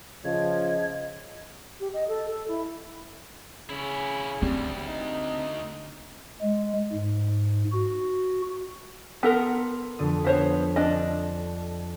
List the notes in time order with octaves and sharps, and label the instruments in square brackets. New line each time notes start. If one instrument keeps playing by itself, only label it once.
[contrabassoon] C#3 [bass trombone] F3 [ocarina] D#5 [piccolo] G#6
[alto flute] G4
D#5
A4
A4
E4
[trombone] C#3 [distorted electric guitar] C#4 E4
[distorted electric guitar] D2 [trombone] G3 [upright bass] C4
[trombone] D#4
[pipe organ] G#3
G#2
F#4
[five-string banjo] B3 A4 A#4 [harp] C6 B6
[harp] F2 D3 D#6
[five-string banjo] B3 C5 C#5
[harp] C4 A4 [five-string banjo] D4 D#5